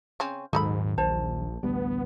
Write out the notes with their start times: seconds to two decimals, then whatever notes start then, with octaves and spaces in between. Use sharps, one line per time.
0.20 C#3 C4 C#4
0.53 D#1 G#2 D#3 F#3 D#4 A4 B5
0.98 A#1 C5 A5
1.63 A1 D2 G3 B3